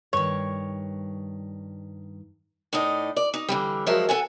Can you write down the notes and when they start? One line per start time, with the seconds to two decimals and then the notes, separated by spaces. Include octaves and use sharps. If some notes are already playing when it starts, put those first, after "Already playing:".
0.13 G2 D#3 C#5
2.73 A2 D#4 D5 D#5
3.16 D5
3.34 D#4
3.49 D3 E3 G3
3.86 F3 F#3 G#3 A#4 C5 E5
4.09 A4 F#5 G#5